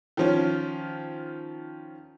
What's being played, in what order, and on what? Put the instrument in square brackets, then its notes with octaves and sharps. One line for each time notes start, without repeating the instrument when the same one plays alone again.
[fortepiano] D#3 F3 C#4